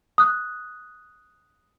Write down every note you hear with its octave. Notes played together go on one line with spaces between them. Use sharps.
D#6 F#6